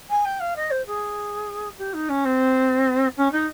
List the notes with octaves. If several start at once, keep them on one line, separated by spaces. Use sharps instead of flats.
G#5
G5
F5
D#5
C5
G#4
G4
D#4
C#4
C4
C#4
D#4